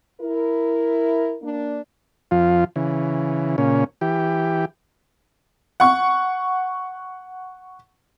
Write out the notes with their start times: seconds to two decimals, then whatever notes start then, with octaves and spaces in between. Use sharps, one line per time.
0.21 E4 A#4
1.42 A#3 D4
2.31 F2 F3 F4
2.76 C#3 E3
3.58 A#2 C#3 C#4
4.01 E3 G4
5.80 F#5 C#6